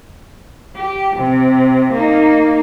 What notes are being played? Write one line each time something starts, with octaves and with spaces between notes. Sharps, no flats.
G4
C3
A#3 D#4